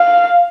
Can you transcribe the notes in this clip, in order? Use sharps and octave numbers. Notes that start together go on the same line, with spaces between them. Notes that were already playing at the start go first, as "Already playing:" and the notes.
Already playing: F5